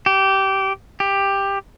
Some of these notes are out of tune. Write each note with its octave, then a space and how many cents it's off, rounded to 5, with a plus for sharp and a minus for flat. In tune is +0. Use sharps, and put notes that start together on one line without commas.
G4 -20
G4 +10